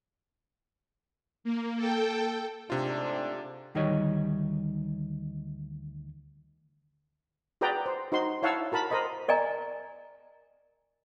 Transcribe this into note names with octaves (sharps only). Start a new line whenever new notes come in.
A#3
A4 G5
G#2 C3 A3 D4 F4
D2 D#3 G3 D#4 C#5 D#5
F#4 G#4 B4 D5 G5 A#5
C5
D#4 F#4 C5 C6
E4 C#5 F5 F#5 A5 E6
F#4 A#4 A5 B5
A#4 C5 D#5 B5
A#4 D5 D#5 G#5 A#5